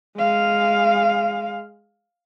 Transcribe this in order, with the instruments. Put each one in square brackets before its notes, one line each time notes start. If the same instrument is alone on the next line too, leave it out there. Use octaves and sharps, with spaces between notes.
[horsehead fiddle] G#3 F5